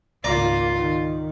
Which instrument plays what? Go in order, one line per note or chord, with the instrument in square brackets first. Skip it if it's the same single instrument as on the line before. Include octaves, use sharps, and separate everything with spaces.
[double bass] G#1 A#3 [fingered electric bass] C#2 [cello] F4 [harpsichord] D5 A#5
[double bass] D#3